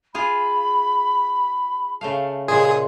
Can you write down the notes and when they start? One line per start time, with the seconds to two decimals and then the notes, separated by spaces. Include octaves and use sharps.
0.14 F4 G#4 F5 B5
2.01 C#3 A3 F5 A5
2.48 A#2 C#3 G#3 G#4 C6